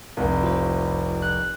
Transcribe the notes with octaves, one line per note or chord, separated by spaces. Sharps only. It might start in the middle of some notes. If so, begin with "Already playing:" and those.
F1 C2
F4 C5
F#6